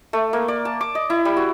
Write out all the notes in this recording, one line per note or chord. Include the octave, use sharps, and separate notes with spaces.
A3
A#3
D5
A5
D6
D#5
E4
G3
F#4